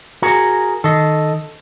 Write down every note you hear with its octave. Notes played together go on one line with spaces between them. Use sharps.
F#4 G#4 A#4
D#3 A4 D#5